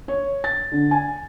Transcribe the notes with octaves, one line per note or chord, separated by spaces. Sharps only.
C#5
A6
D3
G#5